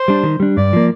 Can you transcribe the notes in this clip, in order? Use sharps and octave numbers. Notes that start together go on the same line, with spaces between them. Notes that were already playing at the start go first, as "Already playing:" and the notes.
Already playing: C5
G3 D4
D#3
G3 D4
G2 D5
F3 A#3